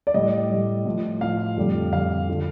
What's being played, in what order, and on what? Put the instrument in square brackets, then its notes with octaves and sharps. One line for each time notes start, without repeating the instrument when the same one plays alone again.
[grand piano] D5
A2 G3 D#5
A2 G3
A2 F3
A2 F3 F5
F2 D3 G3
F2 D3 G3 F5
D3 F3